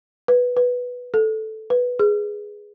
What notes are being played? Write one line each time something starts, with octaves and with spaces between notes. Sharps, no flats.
B4
B4
A4
B4
G#4